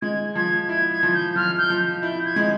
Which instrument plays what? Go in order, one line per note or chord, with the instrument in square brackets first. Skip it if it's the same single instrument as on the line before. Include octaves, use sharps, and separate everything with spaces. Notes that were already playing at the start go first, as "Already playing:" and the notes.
[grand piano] G#3 [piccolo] G#6
[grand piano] F3 [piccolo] G#6
[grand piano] E4 [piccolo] G#6
[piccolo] G#6
[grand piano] F3
[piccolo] G6
[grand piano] F3 [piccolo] F6
[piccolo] G6
[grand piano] F3
[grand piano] E4 [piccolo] G6
[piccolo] G#6
[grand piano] G#3